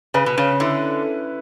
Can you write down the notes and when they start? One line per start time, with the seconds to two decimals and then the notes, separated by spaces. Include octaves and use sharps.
0.14 C#3 B4
0.26 B2
0.37 C#3 C#4
0.60 D3 E4